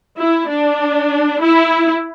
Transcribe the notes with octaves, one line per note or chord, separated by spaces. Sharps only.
E4
D4
E4